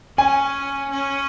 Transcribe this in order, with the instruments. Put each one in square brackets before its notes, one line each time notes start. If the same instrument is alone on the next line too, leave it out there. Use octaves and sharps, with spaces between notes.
[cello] C#4 [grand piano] G#5
[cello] C#4